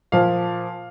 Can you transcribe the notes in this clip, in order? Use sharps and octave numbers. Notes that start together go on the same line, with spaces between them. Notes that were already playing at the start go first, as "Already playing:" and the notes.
A#2 F3 F5